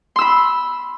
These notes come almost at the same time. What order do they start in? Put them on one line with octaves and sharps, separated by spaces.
C6 E6 B5